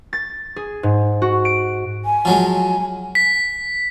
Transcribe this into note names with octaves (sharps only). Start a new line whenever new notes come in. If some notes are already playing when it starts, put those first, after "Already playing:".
A6
G#4
G#2
F#4
D7
G#5
F3 F#3 G#3
G#5
B6